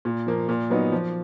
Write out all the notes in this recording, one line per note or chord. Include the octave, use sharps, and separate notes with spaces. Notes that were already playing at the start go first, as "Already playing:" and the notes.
A#2
F3 A#3
A#2
F#3 B3 D#4
F3